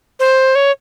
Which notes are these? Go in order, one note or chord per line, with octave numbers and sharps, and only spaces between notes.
C5
C#5